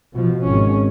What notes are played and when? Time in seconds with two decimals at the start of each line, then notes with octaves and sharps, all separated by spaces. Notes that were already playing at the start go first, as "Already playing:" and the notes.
0.13 B2 F3
0.43 G#1 C#4